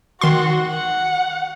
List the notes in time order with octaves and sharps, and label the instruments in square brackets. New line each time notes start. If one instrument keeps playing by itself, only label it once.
[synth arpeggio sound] D#3 C6 [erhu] F#4
[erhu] F#5